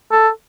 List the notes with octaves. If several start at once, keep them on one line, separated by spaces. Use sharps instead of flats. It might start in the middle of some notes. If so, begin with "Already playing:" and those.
A4